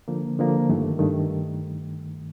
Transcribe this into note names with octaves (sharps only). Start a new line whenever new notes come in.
D3 F3 A#3
D3 F3 A#3
G2 D#3 A3
G2 D#3 A3